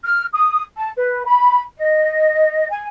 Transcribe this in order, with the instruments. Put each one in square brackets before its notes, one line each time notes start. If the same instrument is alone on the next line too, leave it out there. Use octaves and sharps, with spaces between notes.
[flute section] F6
D#6
A5
B4
B5
D#5
G#5